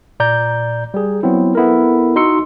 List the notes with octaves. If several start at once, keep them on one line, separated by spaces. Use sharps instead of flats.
A#2 D5 A#5 G6
G3 G#4
F#3 B3 C4 E4
B3 E4 A4 A#4
D#4 F#4 C6 E6 C#7